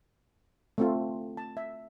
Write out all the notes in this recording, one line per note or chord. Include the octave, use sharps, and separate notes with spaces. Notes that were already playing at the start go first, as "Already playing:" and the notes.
A3 C4 F4
A5
E5